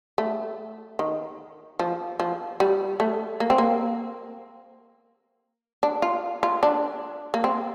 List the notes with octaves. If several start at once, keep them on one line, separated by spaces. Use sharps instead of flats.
A3
D#3
F3
F3
G3
A3
A#3
C4
A#3
D4
F4
F4
D4
A#3
C4